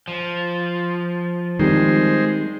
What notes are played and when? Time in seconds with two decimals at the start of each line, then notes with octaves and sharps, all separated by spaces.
0.08 F3
1.59 D#3 G3 G#3 C4 C5